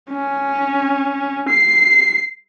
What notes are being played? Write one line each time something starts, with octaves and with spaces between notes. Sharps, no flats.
C#4
C7